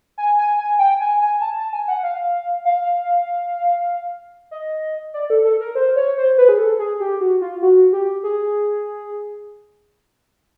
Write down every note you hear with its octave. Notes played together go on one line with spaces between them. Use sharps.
G#5
G#5
G#5
G5
G#5
G#5
A5
A5
G#5
F#5
F5
F5
D#5
D5
A4
A4
A#4
C5
C#5
C5
B4
G#4
A4
G#4
G4
F#4
F4
F#4
G4
G#4